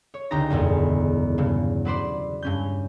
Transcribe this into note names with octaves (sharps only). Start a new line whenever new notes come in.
C#5
C#2 D3 D#4 G4 A#5 A#6
F#1 B1 E2 G#2
G2 C#3
F#3 B4 C5 D5
G2 C#4 G6